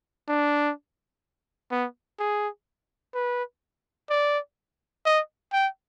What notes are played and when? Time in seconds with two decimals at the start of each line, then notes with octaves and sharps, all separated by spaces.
0.28 D4
1.71 B3
2.19 G#4
3.14 B4
4.10 D5
5.06 D#5
5.53 G5